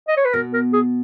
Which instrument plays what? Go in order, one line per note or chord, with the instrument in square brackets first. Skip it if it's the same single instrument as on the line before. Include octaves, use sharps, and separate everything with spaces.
[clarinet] D#5
C#5
B4
[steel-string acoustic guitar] B2 [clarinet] A#4
[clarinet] A#4
G#4